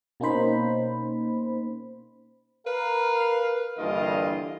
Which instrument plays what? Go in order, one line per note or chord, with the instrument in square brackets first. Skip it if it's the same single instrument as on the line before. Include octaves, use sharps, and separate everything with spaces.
[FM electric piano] B2 A#3 C#4 D#4 C5 B5
[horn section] A#4 B4 F5
G2 D3 E3 A#3 F4 D#5